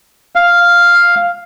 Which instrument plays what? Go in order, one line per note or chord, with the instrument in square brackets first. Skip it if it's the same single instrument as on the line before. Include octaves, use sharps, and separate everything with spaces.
[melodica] F5